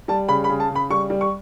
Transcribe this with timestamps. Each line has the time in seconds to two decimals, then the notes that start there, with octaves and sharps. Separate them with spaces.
0.08 G3 A5
0.29 C#3 B5
0.44 B5
0.49 C#3
0.60 A5
0.70 C#3
0.75 B5
0.90 G3 C#6
1.10 G3
1.21 C#6